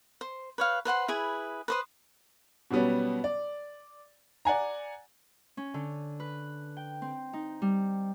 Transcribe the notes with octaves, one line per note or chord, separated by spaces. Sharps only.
C5
B4 C#5 F5
B4 C5 F#5 C6
E4 G#4 B4
B4 C5 D#6
B2 F#3 G3 B3 C#4
D5
D5 F#5 G#5 A#5
C#4
D3
B4
G5
C4
D#4
G3